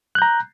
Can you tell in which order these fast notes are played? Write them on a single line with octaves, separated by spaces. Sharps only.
F#6 G6 A#5